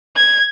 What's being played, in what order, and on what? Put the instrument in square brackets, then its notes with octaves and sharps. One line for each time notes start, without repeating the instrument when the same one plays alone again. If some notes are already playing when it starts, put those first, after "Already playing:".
[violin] G#6